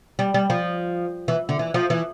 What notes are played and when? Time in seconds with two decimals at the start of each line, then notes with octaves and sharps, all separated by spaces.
0.19 G3
0.34 G3
0.50 F3
1.28 E3
1.49 D3
1.59 E3
1.74 F3
1.90 E3